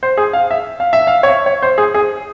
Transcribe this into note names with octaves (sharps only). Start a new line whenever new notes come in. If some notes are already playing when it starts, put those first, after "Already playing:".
C5
G#4
F5
E5
F5
E5
F5
C#5
E5
C#5
C5
G#4
G#4